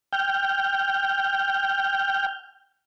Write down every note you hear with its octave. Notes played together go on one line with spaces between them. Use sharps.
G5 F6 G6